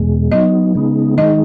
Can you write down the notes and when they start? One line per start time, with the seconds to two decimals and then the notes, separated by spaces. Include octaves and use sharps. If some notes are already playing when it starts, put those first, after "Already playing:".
Already playing: E2 B2 G#3
0.31 F#3 B3 D#4 D#5
0.75 C#3 G#3 B3 D#4
1.17 D#3 G#3 D#4 D#5